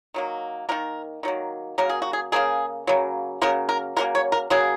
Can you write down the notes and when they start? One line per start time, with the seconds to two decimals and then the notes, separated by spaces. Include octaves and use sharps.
0.14 D#3 F#3 A#3
0.69 D#3 F#3 A#3 A#4
1.23 D#3 F#3 A#3
1.78 C#3 F#3 A#3 A#4
1.89 G#4
2.02 F#4
2.13 G#4
2.32 C#3 F#3 A#3 G#4
2.87 C#3 F#3 A#3
3.42 C#3 F#3 A#3 A#4
3.69 A#4
3.96 C#3 F#3 A#3 A#4
4.15 C#5
4.32 A#4
4.50 C#3 F#3 A#3 G#4